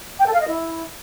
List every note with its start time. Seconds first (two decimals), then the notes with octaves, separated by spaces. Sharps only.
0.19 G5
0.26 A4
0.33 F5
0.41 D#5
0.48 E4